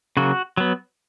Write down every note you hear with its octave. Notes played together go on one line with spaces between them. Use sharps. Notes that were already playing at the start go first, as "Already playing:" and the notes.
C#3 F#3 A#3 F#4
F#3 B3